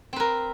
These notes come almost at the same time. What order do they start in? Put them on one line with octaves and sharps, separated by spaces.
C4 B4 A#4